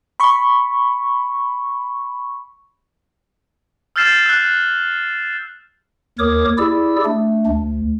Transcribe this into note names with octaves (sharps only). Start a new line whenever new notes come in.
B5 C#6
E6 F6 G6 A6 C7 E7
E6 F#6
D#2 A#4 C#5 D6 D#6
E4 G4 G#4 D5 E6
A3 D4
D2